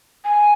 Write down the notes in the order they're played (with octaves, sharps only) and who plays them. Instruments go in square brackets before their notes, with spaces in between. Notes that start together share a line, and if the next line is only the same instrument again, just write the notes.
[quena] G#5